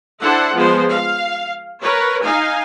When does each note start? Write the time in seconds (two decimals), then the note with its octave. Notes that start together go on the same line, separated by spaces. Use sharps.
0.22 D4 E4 A4 C5 F#5
0.53 F3 G#3 B3 C5
0.90 F5
1.82 A#4 B4 C#5
2.23 D#4 F5 G#5